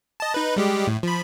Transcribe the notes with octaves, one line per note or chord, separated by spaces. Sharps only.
D#5 A5
D#4 B4
G3 G#3 G4
A2
F3 B5